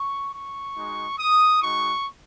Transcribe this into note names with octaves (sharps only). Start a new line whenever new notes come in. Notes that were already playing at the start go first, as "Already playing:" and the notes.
Already playing: C#6
C#6
G#3 D#4 F#4
D#6
G#3 D#4 F#4 C#6